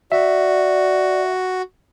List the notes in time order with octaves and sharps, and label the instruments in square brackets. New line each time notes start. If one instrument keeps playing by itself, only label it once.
[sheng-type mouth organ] F#4 [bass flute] D5 [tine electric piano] E5